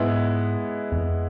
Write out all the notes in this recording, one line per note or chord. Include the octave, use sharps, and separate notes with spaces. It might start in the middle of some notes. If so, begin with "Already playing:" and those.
Already playing: G#2 G#3 B3 E4
F2